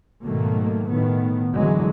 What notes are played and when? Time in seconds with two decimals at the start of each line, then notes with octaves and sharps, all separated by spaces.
0.24 G#2 B2 D#3 F#3 A3 A#3
0.90 A2 D#3 B3
1.54 F#1 D3 E3 F#3 G#3